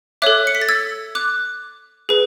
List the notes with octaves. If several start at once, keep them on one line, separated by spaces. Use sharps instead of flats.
A4 C#5 E5 D6 F#6
C#7
B6
A6
E6 G#6
D6 F#6
G#4 B4